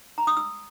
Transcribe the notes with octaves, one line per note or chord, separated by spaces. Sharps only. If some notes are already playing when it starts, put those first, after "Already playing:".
A#5
D#6
E6